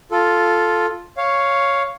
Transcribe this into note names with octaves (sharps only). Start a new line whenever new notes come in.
F4 A4
C#5 F5